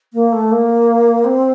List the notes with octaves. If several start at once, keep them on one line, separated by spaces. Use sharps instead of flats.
A#3
A3
A#3
C4